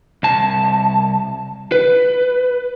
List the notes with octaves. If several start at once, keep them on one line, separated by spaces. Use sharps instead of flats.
C2 A5
B4